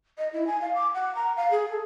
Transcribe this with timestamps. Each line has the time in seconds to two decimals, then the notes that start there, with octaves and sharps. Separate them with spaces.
0.18 D#5
0.33 E4
0.47 G#5
0.61 F5
0.75 D6
0.94 F#5
1.15 A#5
1.37 F5
1.51 G#4
1.70 A4